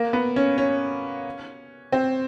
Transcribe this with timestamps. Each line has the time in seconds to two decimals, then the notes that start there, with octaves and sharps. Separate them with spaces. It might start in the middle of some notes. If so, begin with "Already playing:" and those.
Already playing: A#3
0.13 B3
0.36 C#4
0.58 C#4
1.92 C4